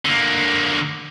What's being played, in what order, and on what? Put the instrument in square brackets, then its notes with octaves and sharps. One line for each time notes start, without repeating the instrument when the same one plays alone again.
[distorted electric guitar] D3 A#3